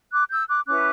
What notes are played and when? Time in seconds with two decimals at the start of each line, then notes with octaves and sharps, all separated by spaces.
0.11 D6 F#6
0.30 E6 G6
0.48 D6 F#6
0.66 C#4 E4 B4 D6 F#6